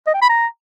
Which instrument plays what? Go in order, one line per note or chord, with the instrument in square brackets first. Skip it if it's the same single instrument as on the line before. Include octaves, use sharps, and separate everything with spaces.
[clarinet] D#5
G5
B5
A#5